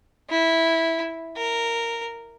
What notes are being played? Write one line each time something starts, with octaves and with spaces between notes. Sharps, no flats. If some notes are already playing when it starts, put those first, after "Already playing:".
E4
A#4